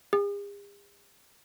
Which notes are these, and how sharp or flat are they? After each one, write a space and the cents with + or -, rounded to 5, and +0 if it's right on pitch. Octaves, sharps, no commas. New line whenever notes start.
G#4 -45